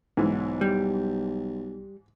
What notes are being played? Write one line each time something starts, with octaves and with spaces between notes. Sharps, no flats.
B1 G#2 E3
G3